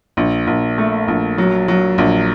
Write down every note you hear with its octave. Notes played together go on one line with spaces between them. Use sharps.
A#1
A#1
A3
A#1
F#3
F#3
A#1